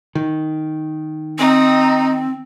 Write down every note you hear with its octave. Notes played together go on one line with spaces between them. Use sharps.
D#3
C4 D#4